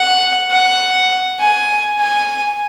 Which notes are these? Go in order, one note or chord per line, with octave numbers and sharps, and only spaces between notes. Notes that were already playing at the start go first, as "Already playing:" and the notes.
Already playing: F#5
F#5
G#5
G#5